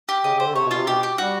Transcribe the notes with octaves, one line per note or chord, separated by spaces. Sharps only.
G4
C#3 D#5
C#3
C5
D3
C3 C#5
B2
F4
C3
B2 G4
G4
G3 F#4